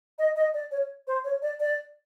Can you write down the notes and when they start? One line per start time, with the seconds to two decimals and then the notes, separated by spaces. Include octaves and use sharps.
0.19 D#5
0.36 D#5
0.54 D5
0.71 C#5
1.07 C5
1.24 C#5
1.42 D5
1.60 D5